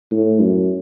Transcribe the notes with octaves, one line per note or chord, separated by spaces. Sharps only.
A2
F#2